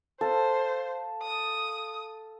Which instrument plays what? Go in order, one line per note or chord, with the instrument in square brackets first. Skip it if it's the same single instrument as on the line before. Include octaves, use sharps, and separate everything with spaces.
[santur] A4 F5 [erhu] C5
[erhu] D#6